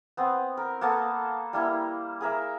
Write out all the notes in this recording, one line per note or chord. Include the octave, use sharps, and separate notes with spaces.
B3 C4
A#4
A#3 B3 A4 A5
G3 A#3 E4
G#4 A#4 E5